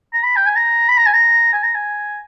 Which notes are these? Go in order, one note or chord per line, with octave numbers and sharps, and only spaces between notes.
A#5
B5
G5
G#5
A#5
B5
A#5
G#5
A#5
G#5
A#5
G#5